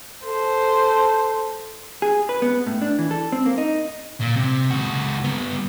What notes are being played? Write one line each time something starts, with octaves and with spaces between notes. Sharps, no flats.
A4 C5
G#4
B4
B3
A2
D4
E3
A4
C4
A#3
D#4
A#2
C3
C#2 F#4
G2 B3